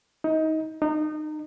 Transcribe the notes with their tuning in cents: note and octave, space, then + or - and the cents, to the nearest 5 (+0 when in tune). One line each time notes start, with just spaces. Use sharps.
D#4 +25
D#4 -25